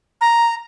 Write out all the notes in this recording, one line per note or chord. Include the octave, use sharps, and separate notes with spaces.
A#5